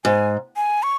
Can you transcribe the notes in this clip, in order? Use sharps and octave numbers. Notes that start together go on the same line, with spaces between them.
G#2 G#5
G#5
C#6